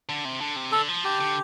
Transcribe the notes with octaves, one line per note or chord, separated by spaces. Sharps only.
D3
C3
D3
C3
D3 A4
F3
D3 G4
D3